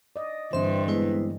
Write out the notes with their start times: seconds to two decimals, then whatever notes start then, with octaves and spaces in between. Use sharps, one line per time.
0.16 D5 D#5
0.53 G2 D3 E3 C4 C5 E5 C6
0.88 G#3 B3 E4 B4 C5